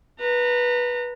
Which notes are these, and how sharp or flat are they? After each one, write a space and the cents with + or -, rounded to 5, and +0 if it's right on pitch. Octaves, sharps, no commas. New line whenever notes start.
B4 -15 A#5 -30